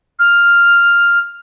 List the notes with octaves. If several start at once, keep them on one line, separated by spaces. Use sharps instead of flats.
F6